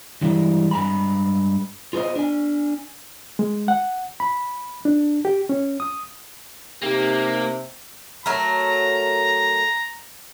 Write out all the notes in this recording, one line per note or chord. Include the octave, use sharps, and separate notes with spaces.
G2 E3 G3 G#3 E4
G2 G#3 G#5 A#5 B5
F4 G#4 B4 C5 D#5
D4 G#5
G#3
F#5
B5
D4
G4
C#4
D#6
C3 A#3 D#4 G4
F#3 A3 A#4 A#5